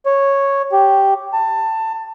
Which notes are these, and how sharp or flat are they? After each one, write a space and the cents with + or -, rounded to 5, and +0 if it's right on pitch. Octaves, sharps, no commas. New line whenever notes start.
C#5 -5
G4 -5
A5 +20